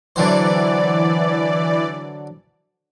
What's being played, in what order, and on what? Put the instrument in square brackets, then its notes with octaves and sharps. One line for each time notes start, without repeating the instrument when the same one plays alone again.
[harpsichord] D3 F#3 C5 [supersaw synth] E3 D5